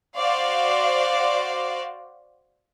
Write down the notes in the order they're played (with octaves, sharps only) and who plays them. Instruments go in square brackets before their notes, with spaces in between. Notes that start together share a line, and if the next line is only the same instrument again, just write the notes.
[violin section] F#4 C5 D5 F5